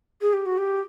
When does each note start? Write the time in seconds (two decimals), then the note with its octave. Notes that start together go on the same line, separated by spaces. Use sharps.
0.21 G#4
0.33 G4
0.45 F#4
0.57 G4